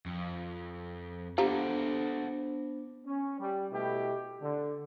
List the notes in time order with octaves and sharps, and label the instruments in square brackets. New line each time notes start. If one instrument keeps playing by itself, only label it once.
[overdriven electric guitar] F2
[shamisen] F3 G4 A#5 [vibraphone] B3 D4 C5 [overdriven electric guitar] F#4 A4
[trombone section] C#4
G3
B2 A3 E4 G4
D3